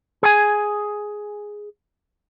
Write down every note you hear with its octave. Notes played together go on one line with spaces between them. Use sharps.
G#4 G#5